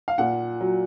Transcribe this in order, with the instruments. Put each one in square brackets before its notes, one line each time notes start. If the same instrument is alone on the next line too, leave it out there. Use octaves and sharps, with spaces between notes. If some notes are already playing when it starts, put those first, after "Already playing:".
[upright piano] F5
A#2 F#5
F#3